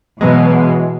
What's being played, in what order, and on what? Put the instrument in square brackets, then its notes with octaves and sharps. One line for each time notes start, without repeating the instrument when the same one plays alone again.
[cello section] B2 [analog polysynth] E3 F#3 G#3